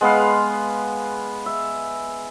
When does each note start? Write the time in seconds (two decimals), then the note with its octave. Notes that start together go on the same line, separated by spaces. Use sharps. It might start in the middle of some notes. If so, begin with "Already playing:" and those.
0.01 G#3 B3 B4 F5
1.46 E5